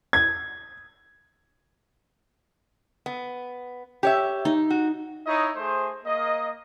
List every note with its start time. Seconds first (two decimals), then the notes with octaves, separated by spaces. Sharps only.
0.13 G#6
3.06 B3
4.03 G4 C#5 E5
4.45 D#4
4.70 F#4
5.25 D#4 E4 C#5 D#5
5.56 A3 G#4 C5
6.05 A#3 D#5